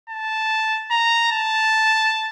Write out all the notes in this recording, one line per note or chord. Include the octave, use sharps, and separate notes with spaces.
A5
A#5
A5